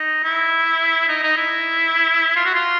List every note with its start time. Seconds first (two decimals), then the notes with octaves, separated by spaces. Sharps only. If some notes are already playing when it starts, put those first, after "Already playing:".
Already playing: D#4
0.24 E4
1.09 D#4
1.23 D#4
1.37 E4
2.36 F4
2.46 F#4
2.55 F4